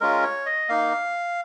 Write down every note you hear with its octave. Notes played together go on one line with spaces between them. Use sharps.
G#3 C#4 F4 A#4
C#5
D#5
A#3 D#4 F5